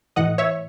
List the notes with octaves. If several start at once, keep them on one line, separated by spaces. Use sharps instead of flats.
A2 E3 D#5 F#5
C#5 E5